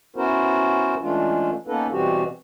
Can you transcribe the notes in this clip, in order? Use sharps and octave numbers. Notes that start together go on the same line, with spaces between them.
B3 C#4 E4 F#4 A#4 C5
E3 G#3 A3 C#4 D4 F4
A#3 B3 C#4 D#4 A4 B4
B2 E3 G3 C4 F#4 G4